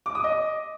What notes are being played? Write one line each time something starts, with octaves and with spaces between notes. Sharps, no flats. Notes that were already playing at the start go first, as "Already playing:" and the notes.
D6
D#6
D#5